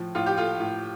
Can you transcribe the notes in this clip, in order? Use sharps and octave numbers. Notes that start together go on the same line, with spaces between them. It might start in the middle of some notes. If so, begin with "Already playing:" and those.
Already playing: A2 F3
A2 F4
G4
A3 F4
A2